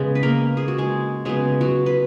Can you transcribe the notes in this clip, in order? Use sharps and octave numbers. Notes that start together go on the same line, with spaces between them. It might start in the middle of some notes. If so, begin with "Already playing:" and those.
Already playing: C#3 G#3 B3
B4
A#3 A#4
G#4
F#4
G#3 G#4
C#3 F#3 G#3 B3 G#4
F#3 F#4
B4